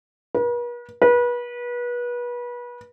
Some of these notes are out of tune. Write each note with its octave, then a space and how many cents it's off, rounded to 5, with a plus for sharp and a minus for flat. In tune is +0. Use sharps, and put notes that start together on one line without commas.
B4 -45
B4 -30